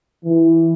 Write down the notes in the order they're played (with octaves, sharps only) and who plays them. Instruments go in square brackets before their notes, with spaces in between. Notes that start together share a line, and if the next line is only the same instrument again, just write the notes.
[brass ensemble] E3